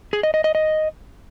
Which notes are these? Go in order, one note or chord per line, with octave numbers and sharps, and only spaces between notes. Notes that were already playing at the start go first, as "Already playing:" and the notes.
G#4
D#5
D#5
D#5
D#5